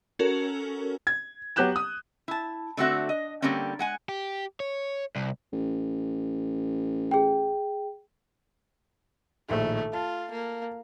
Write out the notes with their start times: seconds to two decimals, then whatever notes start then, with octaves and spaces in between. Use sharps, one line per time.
0.19 C#4 F#4 A4 A#4
1.07 G#6
1.56 F#3 B3 G4 F#6 G6 E7
1.76 D#6
2.28 E4 A5
2.77 D3 A3 C4 F#4 E5
3.09 D#5
3.42 D3 G3 A#3 C4 C#4
3.79 G#3 F#5 G#5
4.09 G4
4.60 C#5
5.16 C2
5.53 A1
7.11 G#4 G5
9.49 A#1 A2 D#3 A3
9.93 F4 A5
10.31 A#3